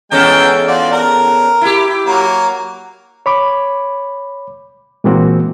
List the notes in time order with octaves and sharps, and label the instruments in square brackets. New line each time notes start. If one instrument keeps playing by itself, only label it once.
[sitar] E2 C#4 A4 [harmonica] G#3 G5 A#5
[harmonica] F4 F#4 D5
A#4 A#5
[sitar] E4 G4
[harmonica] F#3 A#3
[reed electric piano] C#5 B5 D6
A#2 E3 G#3 A#3 C4 F#4